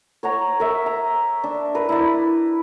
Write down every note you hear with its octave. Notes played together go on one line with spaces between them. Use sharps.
C#5 F#5 A#5
A#4 E5
A#5
D4
A#4 B4
E4 D5